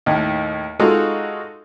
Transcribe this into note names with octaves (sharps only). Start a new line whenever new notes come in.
D#2 A2 D#3
G#3 D#4 F4 F#4 A4